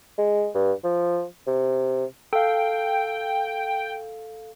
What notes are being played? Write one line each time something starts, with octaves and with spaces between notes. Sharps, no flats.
G#3
G2
F3
C3
A4 F5 G5